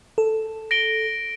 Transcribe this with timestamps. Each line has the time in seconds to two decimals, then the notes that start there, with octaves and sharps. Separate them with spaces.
0.18 A4
0.71 A#6 D7 G7